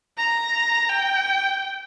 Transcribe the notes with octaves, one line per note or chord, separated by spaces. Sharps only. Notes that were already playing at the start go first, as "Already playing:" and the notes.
A#5
G5